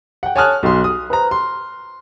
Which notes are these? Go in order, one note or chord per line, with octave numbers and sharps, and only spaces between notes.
F#5 G5
C#5 G#5 A5 D#6 F6 F#6
B1 C6
D#6
B4 C5 A#5
C6